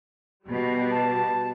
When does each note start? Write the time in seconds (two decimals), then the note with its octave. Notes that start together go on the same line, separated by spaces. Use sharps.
0.46 B2 G3
0.91 A5